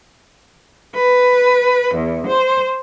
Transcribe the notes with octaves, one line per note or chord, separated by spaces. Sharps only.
B4
E2
C5